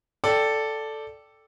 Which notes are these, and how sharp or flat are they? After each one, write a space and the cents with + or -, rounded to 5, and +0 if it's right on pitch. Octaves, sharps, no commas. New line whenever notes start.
A4 +0 D5 +0 G5 +0